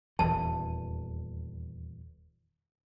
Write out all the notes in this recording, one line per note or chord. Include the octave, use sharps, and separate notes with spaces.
D#1 E2 E3 A5